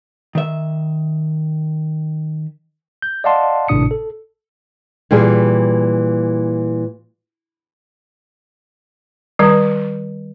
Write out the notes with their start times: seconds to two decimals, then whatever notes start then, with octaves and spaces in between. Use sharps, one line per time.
0.35 D#3 E5
3.02 G6
3.24 D5 D#5 F5 F#5 A5 C6
3.68 G#1 A2 C3 D4 D#6 C#7
3.91 A4
5.11 A#2 E3 G3 G#4
9.39 D#3 G3